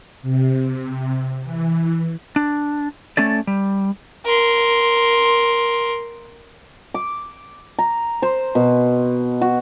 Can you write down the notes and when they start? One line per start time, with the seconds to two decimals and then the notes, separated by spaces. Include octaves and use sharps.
0.22 C3
1.43 E3
2.36 D4
3.17 A3 C#4 A4 D5
3.47 G3
4.26 A#4 C6
6.94 D6
7.79 A#5
8.22 C5
8.55 B2
9.41 F#4